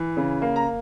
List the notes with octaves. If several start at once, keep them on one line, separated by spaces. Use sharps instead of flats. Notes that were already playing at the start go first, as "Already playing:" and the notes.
Already playing: E3
C#3
A#3
A#5